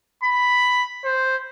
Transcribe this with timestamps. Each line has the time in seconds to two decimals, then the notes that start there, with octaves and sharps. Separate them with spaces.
0.23 B5
1.04 C5